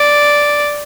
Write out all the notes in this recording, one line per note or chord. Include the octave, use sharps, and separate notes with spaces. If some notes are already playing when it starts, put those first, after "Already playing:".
Already playing: D5